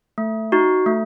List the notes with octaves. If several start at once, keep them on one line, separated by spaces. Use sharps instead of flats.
A3
D#4 F#4
A3